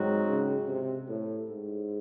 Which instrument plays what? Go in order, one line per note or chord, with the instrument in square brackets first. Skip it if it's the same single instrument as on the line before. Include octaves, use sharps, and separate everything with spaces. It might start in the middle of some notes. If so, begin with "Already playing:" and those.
Already playing: [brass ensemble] G#2 F#3 C4 D#4 F#4
[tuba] C#3
C3
A2
G#2